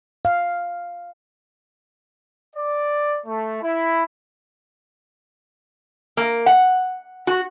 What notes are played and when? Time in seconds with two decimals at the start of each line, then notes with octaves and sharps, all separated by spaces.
0.25 F5
2.56 D5
3.26 A3
3.62 E4
6.17 A#3
6.46 F#5
7.27 F#4